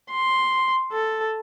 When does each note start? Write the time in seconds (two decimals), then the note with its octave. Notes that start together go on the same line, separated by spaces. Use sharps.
0.11 C6
0.92 A4